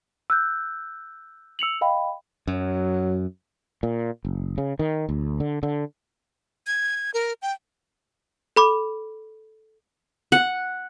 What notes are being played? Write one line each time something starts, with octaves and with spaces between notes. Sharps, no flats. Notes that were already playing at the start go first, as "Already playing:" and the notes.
E6 F#6 G6
E6 C#7 F7 F#7
D#5 F5 G5 B5
F#2 F#3
A#2
F#1
C#3
D#3
D2
D3
D3
G#6
A#4
G5
A4 B5 D6
F#5